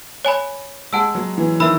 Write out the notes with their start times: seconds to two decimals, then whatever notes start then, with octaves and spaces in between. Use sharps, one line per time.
0.25 C#5 G#5 B5
0.93 G#3 F#5 A5 E6
1.15 F#3
1.38 E3
1.60 D#3 E5 B5 E6